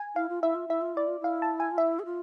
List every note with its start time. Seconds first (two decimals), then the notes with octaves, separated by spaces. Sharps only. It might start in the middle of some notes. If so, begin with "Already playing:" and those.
Already playing: G#5
0.16 E4 F5
0.29 F4
0.42 E4 E5
0.55 F4
0.68 E4 E5
0.81 F4
0.95 E4 D5
1.07 F4
1.20 E4 F5
1.42 A5
1.60 G#5
1.71 F4
1.78 E4 E5
1.99 G#4
2.05 F4